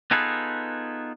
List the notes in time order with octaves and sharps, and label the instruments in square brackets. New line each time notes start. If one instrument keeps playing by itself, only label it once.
[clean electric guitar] B3 D#4 F4 G#4 A4 B4